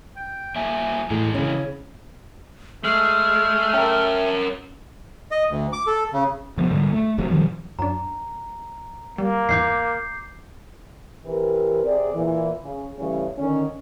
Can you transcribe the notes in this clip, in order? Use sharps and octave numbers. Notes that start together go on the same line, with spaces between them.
G5
F#2 A#3 E5 G#5
A2 E3 G#3 G#4
C#3 C#4 E4
G#3 A3 F6
C#4 A#4 E5 G5 A5
D#5
D2
D6
A4
C#3
C3 F3 B3
G#2 D3 G3 G#3
A3
F1 C3 F#3 C4
B2 D#3 F3 G3
F#2 D4 A#5
G3 A#3
E2 G#2 E3 D6 G6 C7
E3 C4 G4 A#4 B4
C3 G#4 D5
A#2 E3
C#3
C#3 E3 G3 A3 C#4
D3 D#3 C#4